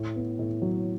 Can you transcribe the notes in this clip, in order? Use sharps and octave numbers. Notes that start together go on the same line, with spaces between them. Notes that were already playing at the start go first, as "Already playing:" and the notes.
Already playing: A2
B3
A2
F#3